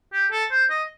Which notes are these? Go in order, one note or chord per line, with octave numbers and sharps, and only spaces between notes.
G4
A4
C5
D#5